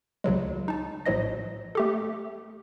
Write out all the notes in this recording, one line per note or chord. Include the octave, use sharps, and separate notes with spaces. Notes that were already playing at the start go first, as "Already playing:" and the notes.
C#2 C#3 F#3 G#3
D#4 A5
A#1 A2 F#3 C5 D#5 A#6
A3 G4 A4